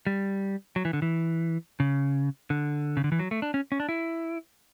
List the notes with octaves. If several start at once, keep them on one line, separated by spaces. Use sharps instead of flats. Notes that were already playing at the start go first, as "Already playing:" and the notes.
G3
F#3
E3
D3
E3
C#3
D3
C#3
D3
E3
F#3
A3
D4
C#4
C#4
D4
E4